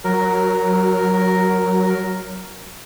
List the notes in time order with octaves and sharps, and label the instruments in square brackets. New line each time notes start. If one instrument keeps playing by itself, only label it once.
[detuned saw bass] F#3 [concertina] A#4